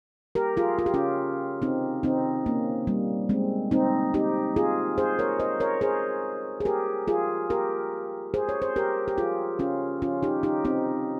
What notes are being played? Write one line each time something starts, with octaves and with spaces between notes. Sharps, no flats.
G4 A#4
F4 G#4
F4
G4
C#4 F4
C4 D#4
C4 D#4
A#3 C#4
G3 A#3
G#3 C4
C4 D#4
D#4 G4
F4 G#4
G#4 C5
A#4 C#5
C5 D#5
A#4 C#5
G#4 C5
G#4
G4 A#4
F4 G#4
G4 A#4
G#4 C5
C#5
C5
G4 A#4
G4
F4 G#4
C#4 F4
C#4 F4
D#4 G4
D#4 G4
C4 D#4